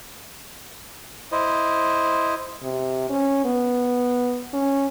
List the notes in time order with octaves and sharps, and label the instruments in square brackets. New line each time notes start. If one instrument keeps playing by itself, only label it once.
[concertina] E4 C5 D#5
[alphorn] C3
C#4
B3
C#4